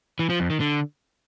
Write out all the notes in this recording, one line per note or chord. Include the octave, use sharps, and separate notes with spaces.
E3
F3
F2
D#3
D3